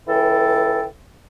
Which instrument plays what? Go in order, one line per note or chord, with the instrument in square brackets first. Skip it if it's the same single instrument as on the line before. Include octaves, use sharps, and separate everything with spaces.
[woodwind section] C#2 E3 A4 G5